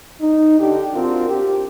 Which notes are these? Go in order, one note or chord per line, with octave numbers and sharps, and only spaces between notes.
D#4
D3 D4 G4
C4 D4 F4 F#4 A#4
G4